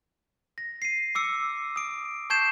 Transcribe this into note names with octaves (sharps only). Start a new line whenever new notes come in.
A#6
C7 D#7
D6 E6 C#7
D#6 D7
A5 C#6 G6 G#6 C7 E7